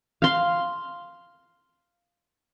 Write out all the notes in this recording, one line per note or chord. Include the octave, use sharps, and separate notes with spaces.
F5 C6